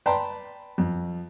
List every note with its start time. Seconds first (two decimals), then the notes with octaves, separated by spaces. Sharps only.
0.06 B4 D5 G5 A5 A#5 C6
0.78 F2